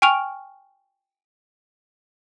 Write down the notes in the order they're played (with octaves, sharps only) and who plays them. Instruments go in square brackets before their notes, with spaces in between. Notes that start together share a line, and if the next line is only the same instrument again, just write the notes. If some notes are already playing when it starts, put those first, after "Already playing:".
[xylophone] G5 G#5 C#6 F6 D7 F7